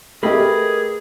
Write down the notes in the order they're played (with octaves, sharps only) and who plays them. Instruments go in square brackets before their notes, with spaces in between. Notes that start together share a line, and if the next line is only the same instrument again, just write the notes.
[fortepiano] A3 G4 D#5 [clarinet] G#4 [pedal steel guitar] A#4 B4 B5